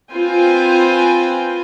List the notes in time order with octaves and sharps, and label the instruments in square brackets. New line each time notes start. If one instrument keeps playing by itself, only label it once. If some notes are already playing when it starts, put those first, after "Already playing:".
[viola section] C4 F4 B4 C5 G5 G#5